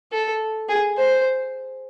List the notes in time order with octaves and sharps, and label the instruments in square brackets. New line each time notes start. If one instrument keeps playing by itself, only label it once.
[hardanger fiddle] A4
G#4
C5